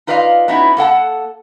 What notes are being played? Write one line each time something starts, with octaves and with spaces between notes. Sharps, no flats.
D#4 F4 B4 D5 D#5 F5
B3 C#4 D#4 E4 F#4
A#3 A4 F#5 A5